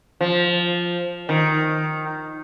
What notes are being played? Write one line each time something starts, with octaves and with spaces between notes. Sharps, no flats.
F3
D#3